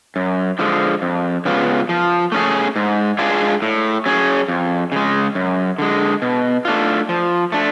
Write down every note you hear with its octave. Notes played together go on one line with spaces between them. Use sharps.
F#2
D3 F3 G#3
F2
C#3 G#3 B3 F4
F3
A3 C#4 G#4
G#2
G#3 D4 F4 G#4
A2
F#3 C#4 G#4
F2
C#3 G#3
F#2
D3 G#3
B2
A3 D4 F4
F3
A3 D4